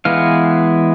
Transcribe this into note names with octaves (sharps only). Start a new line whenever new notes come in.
E3 G#3 B3 F5